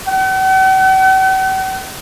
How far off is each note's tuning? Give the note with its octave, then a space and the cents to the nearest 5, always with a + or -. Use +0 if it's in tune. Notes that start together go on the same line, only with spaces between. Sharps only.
F#5 +45